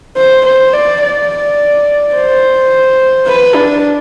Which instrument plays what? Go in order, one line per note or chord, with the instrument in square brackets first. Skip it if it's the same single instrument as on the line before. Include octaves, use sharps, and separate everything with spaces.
[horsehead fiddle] C5
C5
D5
D5
C5
B4
D4